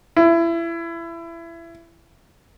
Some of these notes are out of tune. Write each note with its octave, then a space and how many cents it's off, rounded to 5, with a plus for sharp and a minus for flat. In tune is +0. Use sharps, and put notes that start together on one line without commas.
E4 +25